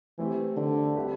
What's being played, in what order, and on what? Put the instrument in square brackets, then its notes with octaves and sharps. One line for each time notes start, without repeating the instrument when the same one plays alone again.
[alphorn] E3 [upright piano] A3 C4 G4
[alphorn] D3
[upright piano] G3 C4 G4 B4 E5